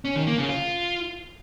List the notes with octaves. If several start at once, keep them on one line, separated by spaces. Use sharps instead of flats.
C#4
D#3
A#3
C#3
F4